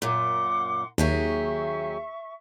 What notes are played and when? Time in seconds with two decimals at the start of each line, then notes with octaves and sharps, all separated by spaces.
0.02 F#2 A#2 F#5 C6 D6
0.98 D#2 F#3 G4 G#4 E5 C#6